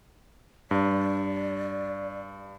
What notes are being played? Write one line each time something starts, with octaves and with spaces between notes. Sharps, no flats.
G2 D5